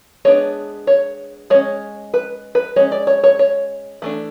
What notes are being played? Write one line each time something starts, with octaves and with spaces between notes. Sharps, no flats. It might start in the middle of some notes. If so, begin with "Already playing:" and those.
G#3 B3 D4 C#5
C#5
G#3 C#4 C#5
B4
B4
G#3 C#4 C#5
D5
C#5
C#5
C#5
E3 A3 D4